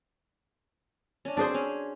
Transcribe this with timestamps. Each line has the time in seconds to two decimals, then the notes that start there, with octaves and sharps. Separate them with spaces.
1.25 C#4 D4
1.37 C4 D4 F#4 G#4 C5 F#5
1.54 C#4